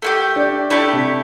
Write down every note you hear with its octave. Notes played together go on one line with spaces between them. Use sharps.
A3 E4 G4
D4
A3 D4 E4 G4
C3